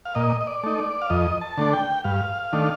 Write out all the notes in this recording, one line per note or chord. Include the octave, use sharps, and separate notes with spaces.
F5
A#2 D#5
D#5
D5
A3 D#4
D5
F5
F2 D#5
A5
D3 A3 D4
G5
G2 F5
D#3 A3 D4